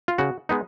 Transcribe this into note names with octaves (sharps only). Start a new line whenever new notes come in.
F4
C#3 F#4
G#3 B3 D#4